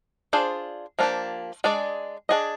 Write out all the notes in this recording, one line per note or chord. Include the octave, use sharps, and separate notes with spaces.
D4 F4 G#4 C5
F3 A#3 D4 G4
G#3 D4 G#4 D5
D4 G#4 D#5